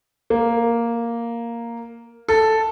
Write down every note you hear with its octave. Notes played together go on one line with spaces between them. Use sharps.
A#3
A4